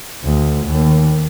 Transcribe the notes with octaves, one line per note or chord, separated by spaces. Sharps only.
D2
D#2